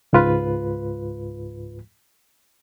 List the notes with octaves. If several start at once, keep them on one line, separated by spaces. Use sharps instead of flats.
C#2 G#2 F4 B4